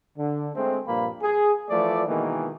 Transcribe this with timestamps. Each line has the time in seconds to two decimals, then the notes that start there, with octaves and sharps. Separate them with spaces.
0.17 D3
0.55 G#3 A3 C4
0.87 G2 A#2 F3 A#3 B5
1.22 G#4
1.70 E3 F3 A3 D5
2.08 B2 D#3 E3 G#3 A#3